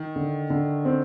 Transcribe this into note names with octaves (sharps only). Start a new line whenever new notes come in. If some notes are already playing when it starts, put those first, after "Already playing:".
Already playing: D#3
D3
D3
C4